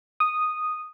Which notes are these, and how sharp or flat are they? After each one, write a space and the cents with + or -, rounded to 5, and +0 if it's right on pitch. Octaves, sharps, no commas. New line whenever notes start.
D#6 -5